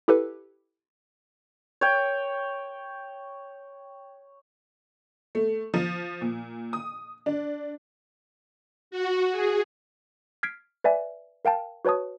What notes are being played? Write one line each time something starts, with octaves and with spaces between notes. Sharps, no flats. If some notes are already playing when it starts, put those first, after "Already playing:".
E4 G4 A4 B4
C#5 G5
A3
F3
A#2
D#6
D4
F#4
G#4
F6 G#6 B6 C7 D7
B4 D5 E5 G#5
A#4 F5 G5 A5
F#4 B4 C#5 A5 D#6